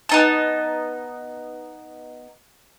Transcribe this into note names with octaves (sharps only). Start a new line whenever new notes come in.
B3 D#4 A5